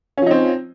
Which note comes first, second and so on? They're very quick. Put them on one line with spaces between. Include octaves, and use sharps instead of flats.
C#4 F3 D#4 C4